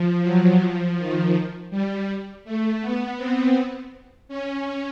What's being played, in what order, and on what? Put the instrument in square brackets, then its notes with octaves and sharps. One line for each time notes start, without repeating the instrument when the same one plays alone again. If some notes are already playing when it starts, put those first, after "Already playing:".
Already playing: [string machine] F3
F#3
F3
D#3
G3
A3
B3
C4
C#4